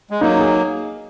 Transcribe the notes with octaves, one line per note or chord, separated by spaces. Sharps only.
G#3
F#3 A#3 D#4
G#4